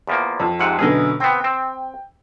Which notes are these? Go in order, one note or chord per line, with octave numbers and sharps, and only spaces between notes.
E2 F3 A#3
F2
G#2 C3 F#5
F#2 B2 D3 G#4 D#5
B3 C4 G5
C4